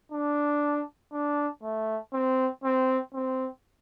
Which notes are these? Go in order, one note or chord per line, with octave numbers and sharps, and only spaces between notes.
D4
D4
A3
C4
C4
C4